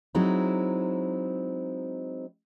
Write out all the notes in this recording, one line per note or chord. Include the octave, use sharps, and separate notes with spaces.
F#3 G#3 C4 D#4 E4